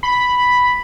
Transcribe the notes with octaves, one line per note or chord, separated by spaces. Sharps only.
B5